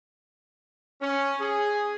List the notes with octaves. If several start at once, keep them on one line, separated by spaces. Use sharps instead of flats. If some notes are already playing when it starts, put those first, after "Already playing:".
C#4
G#4